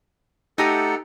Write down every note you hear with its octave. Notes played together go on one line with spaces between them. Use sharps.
A3 D#4 G4 A4 F#5 G5 A#5 D#6